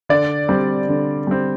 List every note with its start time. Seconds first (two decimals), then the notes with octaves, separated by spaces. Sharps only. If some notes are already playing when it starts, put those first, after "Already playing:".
0.09 D3 D5
0.49 G3 C4
0.88 D3
1.27 G3 C4